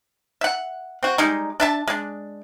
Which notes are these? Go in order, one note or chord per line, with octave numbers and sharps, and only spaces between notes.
E5 F#5
C4 F#4
G3 G#3 D#4
D4 E5 A5
G#3 D4